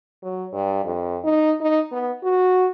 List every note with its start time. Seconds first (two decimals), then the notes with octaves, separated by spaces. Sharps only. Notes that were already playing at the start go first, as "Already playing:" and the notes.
0.23 F#3
0.53 G2
0.84 F2
1.24 D#4
1.60 D#4
1.92 B3
2.23 F#4